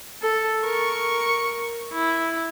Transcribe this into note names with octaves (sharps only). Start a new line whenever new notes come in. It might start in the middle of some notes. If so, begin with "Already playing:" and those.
A4
A#4 C#6
E4